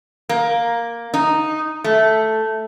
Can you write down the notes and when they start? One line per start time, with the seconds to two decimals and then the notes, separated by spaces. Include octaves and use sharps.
0.29 A#3
1.14 D#4
1.84 A3